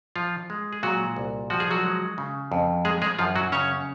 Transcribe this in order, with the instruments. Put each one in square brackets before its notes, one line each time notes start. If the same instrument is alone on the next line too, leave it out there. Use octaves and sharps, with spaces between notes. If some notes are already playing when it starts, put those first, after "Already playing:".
[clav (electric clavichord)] F3 F4
G#3
G#4
A#2 F#3 F#4
C2
F3 F#4
G#4
F#3 F#4
G#3
C#3
F2
G#3 G#4
G#3 G#4
F#2 F3 F4
F#3 F#4
C#3 C#4 C#5